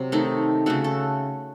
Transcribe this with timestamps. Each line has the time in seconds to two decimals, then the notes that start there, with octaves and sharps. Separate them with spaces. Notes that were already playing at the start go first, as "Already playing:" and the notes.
Already playing: C3 F#3 C4
0.12 D#3 A3 D#4
0.66 C#3 A3 F#4
0.84 A4